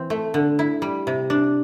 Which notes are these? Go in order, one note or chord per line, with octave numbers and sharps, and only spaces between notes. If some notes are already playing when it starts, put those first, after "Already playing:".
Already playing: E3 C4
A3
D3
E4
G3
C3
D4